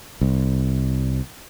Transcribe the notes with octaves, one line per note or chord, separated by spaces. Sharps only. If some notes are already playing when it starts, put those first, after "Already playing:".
C2